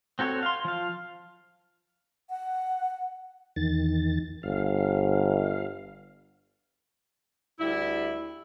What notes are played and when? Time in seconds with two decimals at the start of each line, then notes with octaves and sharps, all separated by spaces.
0.19 C4 F#4 A4 C#5
0.43 F5 C6
0.65 F3 F5
2.30 F#5
3.56 E2 D#3 A6
4.43 G1 F5
7.60 D2 G3 E4